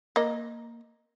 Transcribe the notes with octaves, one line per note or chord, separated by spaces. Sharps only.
A#3 D#5